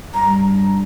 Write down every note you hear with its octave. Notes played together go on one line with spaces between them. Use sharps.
G2 A#5